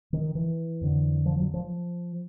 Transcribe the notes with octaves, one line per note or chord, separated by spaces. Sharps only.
D#3
E3
F2 D3
F3
F#3
F3